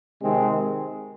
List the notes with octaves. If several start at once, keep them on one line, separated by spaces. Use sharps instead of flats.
C3 D#3 G#3 C4